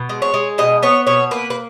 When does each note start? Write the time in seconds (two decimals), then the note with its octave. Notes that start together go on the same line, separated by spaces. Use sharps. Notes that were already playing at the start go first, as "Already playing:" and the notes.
Already playing: B2
0.09 G#3
0.22 C#5
0.34 G#3
0.58 B2 D#5
0.83 B3 C#5
1.07 B2 C#5
1.31 A#3 B4
1.50 B4